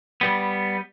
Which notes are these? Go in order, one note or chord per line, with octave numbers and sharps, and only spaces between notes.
G3 B3